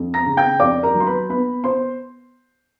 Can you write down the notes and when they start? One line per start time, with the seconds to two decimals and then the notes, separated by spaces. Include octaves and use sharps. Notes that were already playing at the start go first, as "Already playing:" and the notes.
Already playing: F2
0.14 A#5 A#6
0.26 C#3
0.37 G5 G6
0.60 F2 D5 D6
0.83 A#4 A#5
0.95 F#3
1.00 C6
1.07 B4 B5
1.29 B3 B4 B5
1.64 C5 C6